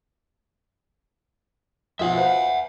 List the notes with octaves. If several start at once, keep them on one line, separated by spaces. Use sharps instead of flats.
B1 F3 F#3 E5 F#5
B4 C5 F5